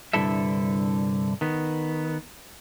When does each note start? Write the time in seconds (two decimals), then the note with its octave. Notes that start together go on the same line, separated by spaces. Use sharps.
0.13 C2 G2 D3 E4 A4 E5
1.41 D#3 B3